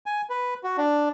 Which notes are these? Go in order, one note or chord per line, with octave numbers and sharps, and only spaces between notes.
G#5
B4
F#4
D4